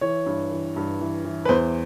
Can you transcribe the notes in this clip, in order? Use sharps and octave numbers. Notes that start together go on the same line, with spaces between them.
E3 C#5
G2
E3
G2
E3
E3
B4
E2 C5